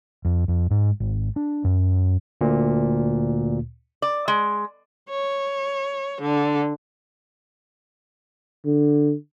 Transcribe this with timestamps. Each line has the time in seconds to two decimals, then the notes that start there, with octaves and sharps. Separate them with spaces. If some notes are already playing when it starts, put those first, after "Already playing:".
0.25 F2
0.48 F2
0.71 G#2
1.00 G#1
1.36 D4
1.64 F#2
2.41 D2 A#2
4.02 D5
4.28 G#3
5.10 C#5
6.22 D3
8.65 D3